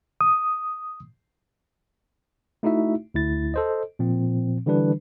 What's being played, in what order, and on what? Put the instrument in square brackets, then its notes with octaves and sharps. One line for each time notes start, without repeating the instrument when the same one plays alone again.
[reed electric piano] D#6
[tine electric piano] A3 D#4 E4 F#4 E5
D2 E4 A6
A4 C5 D#5
A#2 F3 C4
D3 E3 G3 D4 B4